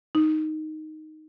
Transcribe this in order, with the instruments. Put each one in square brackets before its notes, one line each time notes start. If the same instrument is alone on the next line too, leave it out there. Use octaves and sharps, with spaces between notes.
[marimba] D#4